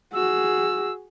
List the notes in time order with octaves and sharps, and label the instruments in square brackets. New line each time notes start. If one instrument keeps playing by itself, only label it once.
[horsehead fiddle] F#4 G#4 [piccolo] E6